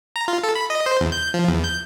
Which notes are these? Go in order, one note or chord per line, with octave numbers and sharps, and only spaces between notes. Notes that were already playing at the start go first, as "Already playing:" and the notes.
A#5
F4
A4
B5
D#5
C5
E2
G6
F3
E2
G6